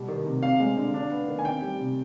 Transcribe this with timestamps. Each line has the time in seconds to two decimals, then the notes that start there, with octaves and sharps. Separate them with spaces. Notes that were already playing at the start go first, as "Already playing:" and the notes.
Already playing: B2 G3
0.08 D#3
0.26 C3
0.43 C4 F5
0.60 G#3
0.77 D3
0.94 D4
1.11 B3
1.28 D#3
1.39 G#5
1.45 C4 G5
1.62 G3
1.80 C3